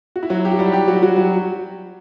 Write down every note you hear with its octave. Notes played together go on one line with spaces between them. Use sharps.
F#4
E4
F#3 F#4
G4
F#4
G3 G4
G3 G4
F#3 F#4
F#3 F#4
F#3 F#4